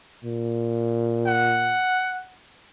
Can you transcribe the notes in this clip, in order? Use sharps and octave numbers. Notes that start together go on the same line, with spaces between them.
A#2
F#5